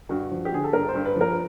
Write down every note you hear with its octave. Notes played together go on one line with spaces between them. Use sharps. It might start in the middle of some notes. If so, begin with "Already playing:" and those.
G2 F#4
F3
G4
D3 G#4
A4
G2 A#4
C5
G2
B4
F3 A#4